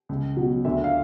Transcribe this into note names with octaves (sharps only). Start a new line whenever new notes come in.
C#2
B2 F#3
D2 E5
F5